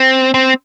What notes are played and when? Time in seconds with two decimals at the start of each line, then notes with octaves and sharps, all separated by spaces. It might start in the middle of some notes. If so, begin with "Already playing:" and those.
Already playing: C4
0.34 C4